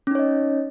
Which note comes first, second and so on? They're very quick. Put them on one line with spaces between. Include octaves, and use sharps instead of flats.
C#4 D#4 C#5 D#5